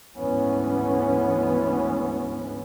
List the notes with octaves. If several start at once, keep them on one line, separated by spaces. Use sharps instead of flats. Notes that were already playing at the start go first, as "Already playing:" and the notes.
D2 G#2 E3 G#3 B3 C#4